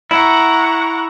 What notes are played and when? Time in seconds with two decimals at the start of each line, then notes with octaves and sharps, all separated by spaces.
0.11 E4 F#5 A#5 C#6